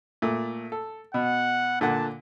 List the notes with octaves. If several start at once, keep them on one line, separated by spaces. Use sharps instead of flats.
A#2 A3
A4
B2 F#5
A#2 D3 F#5 A5